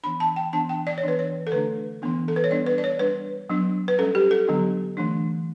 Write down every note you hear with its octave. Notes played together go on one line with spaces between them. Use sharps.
E3 B3 D4 B5
A5
G5
E3 B3 D4 A5
G5
D5
C#5
E3 B3 D4 B4
C#5
A4
D3 A3 D4 B4
E3 B3 D4
A4
B4
C#5
G3 B3 D4 D5
B4
D5
C#5
G3 D4 B4
F#3 B3 D4
B4
G3 C#4 A4
G4
A4
D3 F#3 B3 D4
E3 A3 D4